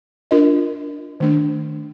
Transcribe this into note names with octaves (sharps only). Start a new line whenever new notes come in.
D4 F4 A#4 D#5
D#3 A3 D4